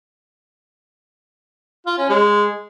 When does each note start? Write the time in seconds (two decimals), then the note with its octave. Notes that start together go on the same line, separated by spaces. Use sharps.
1.86 F4
1.98 C#4
2.09 G#3